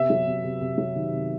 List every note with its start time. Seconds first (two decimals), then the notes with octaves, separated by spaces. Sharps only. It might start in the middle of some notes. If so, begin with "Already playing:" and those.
Already playing: C3 B3 E5
0.10 F#3
0.27 C3
0.44 C3
0.61 C3
0.78 F#3
0.96 D#3
1.12 C3